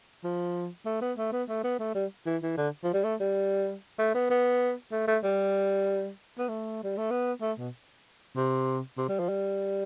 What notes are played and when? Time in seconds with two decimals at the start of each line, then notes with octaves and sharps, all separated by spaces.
0.24 F3
0.86 A3
1.02 B3
1.18 A3
1.32 B3
1.49 A3
1.64 B3
1.79 A3
1.95 G3
2.26 E3
2.43 E3
2.57 D3
2.84 F3
2.94 G3
3.04 A3
3.20 G3
3.99 A3
4.15 B3
4.30 B3
4.92 A3
5.07 A3
5.23 G3
6.38 B3
6.49 A3
6.84 G3
6.98 A3
7.11 B3
7.42 A3
7.58 B2
8.36 C3
8.98 C3
9.09 G3
9.19 F3
9.29 G3